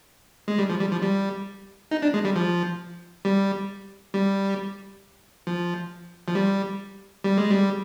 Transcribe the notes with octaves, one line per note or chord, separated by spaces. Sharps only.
G#3
G3
F3
G3
F3
G3
D#4
D4
G#3
G3
F3
G3
G3
F3
F3
G3
G3
G#3
G3